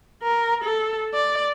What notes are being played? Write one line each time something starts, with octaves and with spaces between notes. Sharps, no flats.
A#4
A4
D5